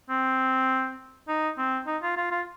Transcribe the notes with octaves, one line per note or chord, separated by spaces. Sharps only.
C4
D#4
C4
D#4
F4
F4
F4